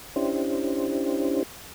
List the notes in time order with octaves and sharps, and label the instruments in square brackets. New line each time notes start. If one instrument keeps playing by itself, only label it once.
[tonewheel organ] C#4 D4 E4 G4 C5